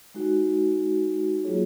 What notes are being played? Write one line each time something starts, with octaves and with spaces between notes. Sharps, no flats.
G#3 D#4 F#4
F#3 A#3 F4 G#4 C#5